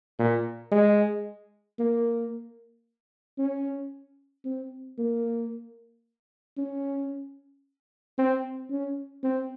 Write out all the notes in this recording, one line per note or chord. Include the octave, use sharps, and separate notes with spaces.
A#2
G#3
A#3
C#4
C4
A#3
C#4
C4
C#4
C4